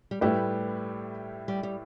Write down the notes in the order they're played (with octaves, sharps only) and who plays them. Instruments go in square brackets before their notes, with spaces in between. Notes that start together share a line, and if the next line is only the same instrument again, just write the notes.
[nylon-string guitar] G3
[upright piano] A2 G3 E4 G4 B4 [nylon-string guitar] A3
[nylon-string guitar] G3
G3